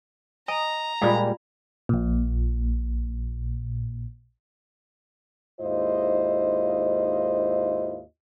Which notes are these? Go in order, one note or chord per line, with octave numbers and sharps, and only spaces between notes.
D#5 G#5 A#5
A#2 G3 G#3 F4 D5 F5
A#1 A#2
D#2 G#2 E4 F4 C5 D#5